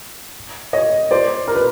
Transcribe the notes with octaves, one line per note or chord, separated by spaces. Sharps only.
C#5 D#5
C5 D5
A#4
B4